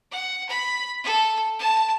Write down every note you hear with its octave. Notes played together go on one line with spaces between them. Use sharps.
F#5
B5
A4
A5